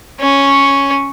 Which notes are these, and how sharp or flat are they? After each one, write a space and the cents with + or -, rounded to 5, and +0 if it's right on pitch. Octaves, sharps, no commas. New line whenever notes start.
C#4 +0 C#5 +0